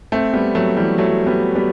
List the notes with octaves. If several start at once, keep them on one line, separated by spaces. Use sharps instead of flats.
A3 C4
G3 B3
F#3 A3
E3 G3
F#3 A3
G3 B3
G3 B3